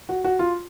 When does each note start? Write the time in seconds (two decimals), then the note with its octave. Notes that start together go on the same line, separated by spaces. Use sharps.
0.09 F#4
0.25 F#4
0.39 F4